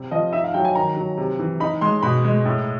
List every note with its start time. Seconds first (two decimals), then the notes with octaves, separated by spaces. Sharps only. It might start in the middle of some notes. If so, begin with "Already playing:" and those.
Already playing: C3 G3
0.11 F3 D#5
0.33 D#4 E5
0.44 F5
0.54 F#3 G5
0.65 G#5
0.75 D#3 A#5
0.97 F#3
1.17 C3
1.39 E3
1.60 D#4 B5
1.81 G#3 C6
2.03 B2 B5
2.25 G#3
2.45 A2